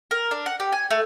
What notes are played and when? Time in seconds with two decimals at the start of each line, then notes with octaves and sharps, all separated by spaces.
0.11 A#4
0.31 D4
0.46 F#5
0.60 G4
0.72 G#5
0.91 A3